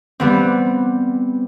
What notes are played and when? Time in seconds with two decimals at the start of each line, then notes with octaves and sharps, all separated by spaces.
0.20 G3 B3 C4